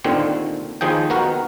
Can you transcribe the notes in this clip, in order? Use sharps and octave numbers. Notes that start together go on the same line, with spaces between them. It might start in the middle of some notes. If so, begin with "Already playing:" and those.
D#2 A#2 D3 D#3 C4
D#2 D#3 F3 G#4 G5
D#3 B3 F#4 A#4